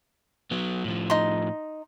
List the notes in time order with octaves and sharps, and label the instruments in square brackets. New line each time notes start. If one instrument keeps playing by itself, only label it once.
[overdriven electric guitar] F#3 B3
A2 F3
[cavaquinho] D#4 C6